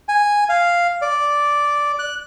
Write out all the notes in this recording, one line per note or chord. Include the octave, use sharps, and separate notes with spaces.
G#5
F5
D5
F#6